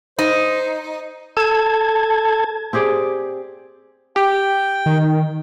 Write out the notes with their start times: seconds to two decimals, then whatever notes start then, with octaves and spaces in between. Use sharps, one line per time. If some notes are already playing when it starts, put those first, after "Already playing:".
0.19 D#4 C5
1.37 A4 A5 G#6
2.73 C4 G4 G#4 D5
4.16 G4 G5
4.86 D#3